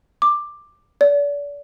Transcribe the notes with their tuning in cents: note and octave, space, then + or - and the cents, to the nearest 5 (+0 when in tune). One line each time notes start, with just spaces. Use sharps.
D6 +10
D5 -35